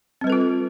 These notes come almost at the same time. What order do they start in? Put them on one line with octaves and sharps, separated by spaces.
C4 G3 B4 A4 F4